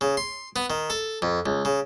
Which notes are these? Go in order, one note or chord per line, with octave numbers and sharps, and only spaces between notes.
C#3
C6
B3
D#3
A4
F2
C#2
C#3